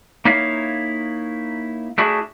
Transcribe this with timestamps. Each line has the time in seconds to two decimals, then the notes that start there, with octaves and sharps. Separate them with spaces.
0.25 A#3 D#4 E4 C#5 F5
1.98 A3 D4 E4 F#4 G#4